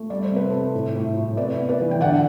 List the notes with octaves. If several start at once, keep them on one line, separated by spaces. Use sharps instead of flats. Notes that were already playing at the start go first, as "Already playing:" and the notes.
Already playing: A3
G3 D5
C5
C3
B4
C3 A4 C5
A2
A2
A2
C3 B4 D5
B3
B4 D5
E3
G5
D3 D5 F#5